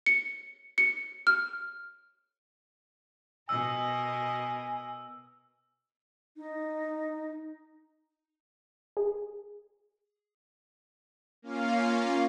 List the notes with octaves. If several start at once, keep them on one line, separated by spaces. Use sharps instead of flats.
C#7
C#7
F6
B2 A#4 D#5 G#5 E6
D#4
G#4
A#3 C#4 F4 F5